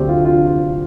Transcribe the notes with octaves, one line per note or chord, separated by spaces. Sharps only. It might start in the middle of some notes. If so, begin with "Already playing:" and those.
Already playing: D2 D3 A3 C4 G4
F4
F4